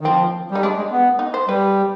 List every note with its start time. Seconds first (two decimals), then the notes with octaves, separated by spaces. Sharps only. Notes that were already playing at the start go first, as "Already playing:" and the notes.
0.01 D#3
0.05 F3 C4
0.51 G3 D#4
0.62 G#3 D4
0.77 G#3
0.91 B3
1.19 D#4
1.34 C5
1.48 G3 B4